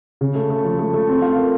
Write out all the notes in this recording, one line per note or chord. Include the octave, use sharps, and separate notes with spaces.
C#3
A3
A3
F3
A3
A3
C4
F4
A#4